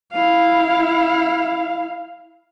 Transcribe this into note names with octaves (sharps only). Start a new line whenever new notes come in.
E4 F5